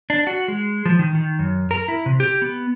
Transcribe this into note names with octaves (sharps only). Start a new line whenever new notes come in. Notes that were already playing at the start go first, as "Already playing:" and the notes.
D4
F#4
G#3
F3
D#3
D#3
F#2
A#4
E4
C3
G4
B3